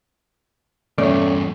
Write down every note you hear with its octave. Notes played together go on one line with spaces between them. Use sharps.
E2 G2 A3 C#4 D5